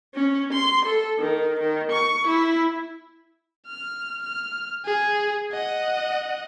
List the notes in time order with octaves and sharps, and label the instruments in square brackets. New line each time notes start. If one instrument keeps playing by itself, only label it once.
[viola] C#4
C6
A4
D#3
D#3
C#6
E4
[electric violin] F6
F6
G#4
D#5 F#5